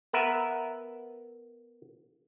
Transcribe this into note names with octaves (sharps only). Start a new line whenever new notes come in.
B3 A#4 B4 E5 A#5